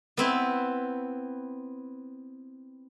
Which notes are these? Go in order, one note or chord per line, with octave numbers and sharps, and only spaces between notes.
B3 C4 E4